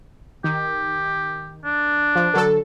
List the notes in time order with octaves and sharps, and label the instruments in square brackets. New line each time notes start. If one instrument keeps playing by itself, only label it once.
[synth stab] D#3 [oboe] G4
[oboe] D4
[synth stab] F3
D3 F#3 A4